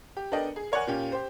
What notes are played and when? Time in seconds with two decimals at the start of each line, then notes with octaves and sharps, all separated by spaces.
0.17 G4
0.31 B3 D4 A4 A#4 D#5 G5
0.56 G#4
0.72 A#4 C#5 D5 F#5 G#5
0.87 A#2 A#3 C#4 G4
1.12 G4 C5